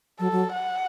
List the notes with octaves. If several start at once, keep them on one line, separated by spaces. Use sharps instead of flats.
F#3 A4
F#3
F#5